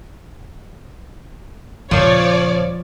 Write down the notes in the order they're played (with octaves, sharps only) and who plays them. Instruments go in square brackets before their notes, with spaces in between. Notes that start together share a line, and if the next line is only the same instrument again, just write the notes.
[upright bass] D#1 C#3 [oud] F3 [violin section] C#5 D5